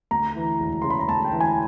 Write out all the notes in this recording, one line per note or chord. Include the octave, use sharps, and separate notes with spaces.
D2 A#5
E3
E1
C#3 C6
B5
A#5
D2 A5
G5
E3 A5
G#5